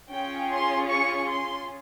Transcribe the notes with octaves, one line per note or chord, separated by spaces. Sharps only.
C#4 F4 G#4 G5
C6
C#6
C6